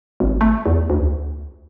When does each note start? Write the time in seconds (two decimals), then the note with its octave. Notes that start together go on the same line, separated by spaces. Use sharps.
0.20 G#1
0.41 A3
0.66 E2
0.90 D2